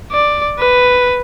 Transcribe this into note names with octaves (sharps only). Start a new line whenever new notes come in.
D5
B4